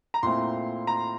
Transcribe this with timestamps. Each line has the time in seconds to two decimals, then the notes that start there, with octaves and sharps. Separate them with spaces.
0.14 A#5
0.23 A#2 A3 C4 E4 C6
0.87 A#5